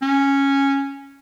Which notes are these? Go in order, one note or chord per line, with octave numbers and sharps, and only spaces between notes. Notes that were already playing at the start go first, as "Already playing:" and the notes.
C#4